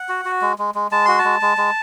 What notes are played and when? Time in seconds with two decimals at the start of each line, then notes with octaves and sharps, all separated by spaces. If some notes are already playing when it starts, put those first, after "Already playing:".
Already playing: F#5
0.09 F#4
0.25 F#4
0.42 G#3
0.58 G#3
0.75 G#3
0.91 G#3 A5
1.05 F#4 C6
1.19 A5
1.25 G#3
1.42 G#3
1.57 G#3